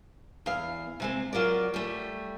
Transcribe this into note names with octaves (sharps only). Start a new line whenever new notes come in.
E2 F5
C3 G#3 C4
F#3 F4 A#4 D5
G3 A3